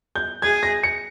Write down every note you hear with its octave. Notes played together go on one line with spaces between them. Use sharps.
G6
G#4 G#6
A#6
C#7